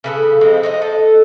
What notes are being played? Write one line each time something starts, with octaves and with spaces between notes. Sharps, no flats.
C#3 B3 A4
F3 G#3 C4 D#4
D#4 C5 D#5
A4